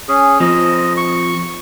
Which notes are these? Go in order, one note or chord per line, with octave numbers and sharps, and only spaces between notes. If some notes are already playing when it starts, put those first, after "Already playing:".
C#4 G#4
F3 C4 D#5
C#6